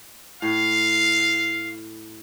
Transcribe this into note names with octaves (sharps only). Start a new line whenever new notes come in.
A2 F5